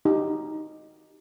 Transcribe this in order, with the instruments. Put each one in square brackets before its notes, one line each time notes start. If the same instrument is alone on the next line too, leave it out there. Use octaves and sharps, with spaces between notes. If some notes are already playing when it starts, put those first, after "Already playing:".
[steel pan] D#4 F#4 G4